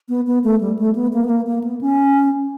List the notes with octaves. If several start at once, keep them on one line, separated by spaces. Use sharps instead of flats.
B3
B3
A3
G3
A3
B3
A#3
B3
A#3
A#3
B3
C#4